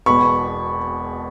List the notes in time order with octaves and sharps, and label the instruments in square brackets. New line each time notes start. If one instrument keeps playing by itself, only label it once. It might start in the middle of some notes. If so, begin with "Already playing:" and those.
[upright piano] E1 E2 B2 B5 C#6